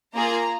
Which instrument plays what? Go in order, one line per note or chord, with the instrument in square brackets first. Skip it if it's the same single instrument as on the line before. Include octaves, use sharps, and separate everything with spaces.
[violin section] A#3 F4 G#4 A#5